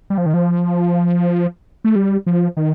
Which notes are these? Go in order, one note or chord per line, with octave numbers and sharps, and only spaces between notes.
G3
F3
D#3
F3
A3
G3
F3
D#3